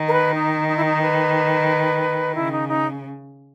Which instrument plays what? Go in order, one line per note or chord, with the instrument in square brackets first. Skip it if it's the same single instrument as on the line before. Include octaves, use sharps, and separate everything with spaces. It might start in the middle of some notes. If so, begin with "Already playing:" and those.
Already playing: [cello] D#3
[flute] A#4
B4
D#4
D#4
E4
D#4
B4
[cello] C#3 [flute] E4
[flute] D#4
D#4